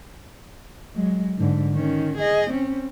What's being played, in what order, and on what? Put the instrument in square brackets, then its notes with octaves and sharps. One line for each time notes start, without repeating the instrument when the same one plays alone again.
[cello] F#3 G#3
G#2 D3
D#3 C#4
G#4 D#5
C4 C#4